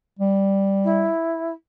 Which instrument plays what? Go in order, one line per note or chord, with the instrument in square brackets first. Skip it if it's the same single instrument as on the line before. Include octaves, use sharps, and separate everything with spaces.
[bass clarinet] G3
[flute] E4